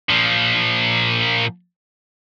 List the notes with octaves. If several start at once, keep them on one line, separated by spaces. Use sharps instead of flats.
A#2 F3